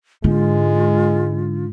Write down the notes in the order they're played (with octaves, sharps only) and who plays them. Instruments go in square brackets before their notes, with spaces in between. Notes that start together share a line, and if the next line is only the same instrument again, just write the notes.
[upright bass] G#2 [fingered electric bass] D3 [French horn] G#3 [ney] F4